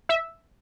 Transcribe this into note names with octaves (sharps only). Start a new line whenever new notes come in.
E5